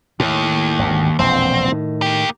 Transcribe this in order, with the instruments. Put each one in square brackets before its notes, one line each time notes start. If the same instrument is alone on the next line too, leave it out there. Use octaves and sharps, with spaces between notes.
[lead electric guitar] D#2 [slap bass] A2
[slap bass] G#1 D2
[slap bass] E1 A#1 F2 [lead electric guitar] C4
[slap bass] A2 D#3
[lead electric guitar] A#3 G4